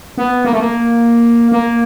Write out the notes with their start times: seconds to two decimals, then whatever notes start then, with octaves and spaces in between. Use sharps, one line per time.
0.18 B3
0.45 A#3
0.53 A3
0.60 A#3
1.52 A#3